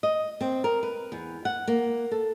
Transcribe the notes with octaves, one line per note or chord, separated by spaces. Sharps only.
D#5
C4
A#4
B4
E2
F#5
A#3
A4